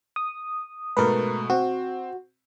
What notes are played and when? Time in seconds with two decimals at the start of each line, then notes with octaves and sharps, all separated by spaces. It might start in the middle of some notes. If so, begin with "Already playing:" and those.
0.16 D#6
0.97 G#2 B2 A3 A#4 B4
1.50 C4 F#4